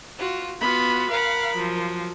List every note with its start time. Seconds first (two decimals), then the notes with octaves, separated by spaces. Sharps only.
0.19 F4 F#4
0.60 B3 F4 F#4 B5
1.10 A#4 F5 F#5 B5
1.55 F3 F#3